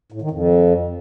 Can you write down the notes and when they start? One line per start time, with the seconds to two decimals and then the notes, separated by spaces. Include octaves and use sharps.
0.12 A2
0.22 D#3
0.31 F2